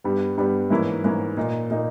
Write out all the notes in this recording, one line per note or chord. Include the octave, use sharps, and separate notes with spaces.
G2 G3 B3
G2 G3 B3
G#2 E3 A#3 C#4 E4
G#2 E3 A#3 C#4 E4
A#2 A#3 D#4
A#2 A#3 D#4